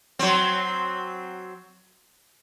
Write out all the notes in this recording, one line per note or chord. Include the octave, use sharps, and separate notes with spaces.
F#3 C4